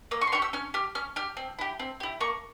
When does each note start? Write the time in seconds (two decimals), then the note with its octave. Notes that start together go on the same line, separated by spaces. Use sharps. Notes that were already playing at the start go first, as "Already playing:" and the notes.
0.11 A#3 E6
0.21 C#6
0.27 C6
0.32 C#4 G4 C#6
0.42 E6
0.53 C#4 F6
0.74 G4 F6
0.95 C#4 F6
1.16 G4 F6
1.37 C4
1.59 E4 G4
1.80 C4
2.00 E4 G4
2.21 A#3 C#6